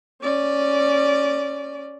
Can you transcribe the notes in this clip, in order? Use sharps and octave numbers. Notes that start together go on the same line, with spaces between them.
C#4 D5